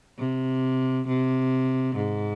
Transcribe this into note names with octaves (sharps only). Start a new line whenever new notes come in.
C3
C3
G#2